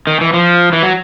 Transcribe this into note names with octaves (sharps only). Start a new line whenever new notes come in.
D#3
E3
F3
E3
F#3